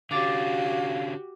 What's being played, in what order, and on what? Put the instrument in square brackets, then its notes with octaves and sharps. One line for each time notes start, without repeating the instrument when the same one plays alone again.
[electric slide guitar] D3 C#4 [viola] F#4 G4 [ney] F5 [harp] D6 A6